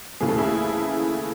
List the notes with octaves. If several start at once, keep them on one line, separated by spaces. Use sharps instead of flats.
D#2 C#3 E3 A3 G#4
A4
E4 G#4